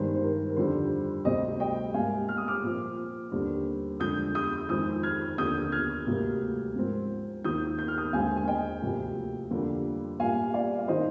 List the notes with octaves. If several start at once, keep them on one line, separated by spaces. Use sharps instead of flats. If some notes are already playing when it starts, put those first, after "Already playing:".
Already playing: G2 D#3 G#3 C5
C5
A#4
A#4
F2 D3 G3 C5
D2 C3 G3 C5 D#5
D#5 G5
G#2 G3 A#3 F5 G#5
F6
D#6
D6 F6
A#2 F3 C4
D#2 D3 G3 C4
F2 D3 G#3 D#6 G6
D#6 G6
F2 D#3 G#3 C4 D#6 G6
F6 G#6
D#2 D3 F3 D#6 G6
F6 G#6
D2 C3 G3 A#3
G#2 F3 C4
D#2 D#3 A#3 D#6 G6
G6
F6
D#6 G6
D#2 D3 G#3 C4 F5 G#5
G#5
D#5 G5
D2 C3 F3 A#3
F2 D3 G3 A#3
A#2 G3 A#3 F5 G#5
D5 F5
F5
D#3 A#3 C5 D#5